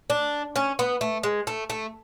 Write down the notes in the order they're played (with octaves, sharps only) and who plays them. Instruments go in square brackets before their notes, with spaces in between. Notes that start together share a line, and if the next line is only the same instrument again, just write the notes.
[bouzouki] D4
C#4
B3
A3
G#3
A3
A3